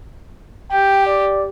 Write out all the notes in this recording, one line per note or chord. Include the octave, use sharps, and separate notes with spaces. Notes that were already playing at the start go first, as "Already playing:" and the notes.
G4 G5
D5